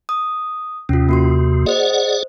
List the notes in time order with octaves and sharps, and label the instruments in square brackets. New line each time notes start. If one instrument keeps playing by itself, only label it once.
[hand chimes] D#6
[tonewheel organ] D#2 C3 [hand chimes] C#4 F4
[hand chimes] A#3 F#4 C6
[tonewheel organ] G#4 D5 F#5 [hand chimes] C5 D#5